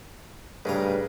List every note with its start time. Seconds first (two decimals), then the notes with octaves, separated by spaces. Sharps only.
0.65 A1 G2 C#3 G#4 A#4 B4 A#5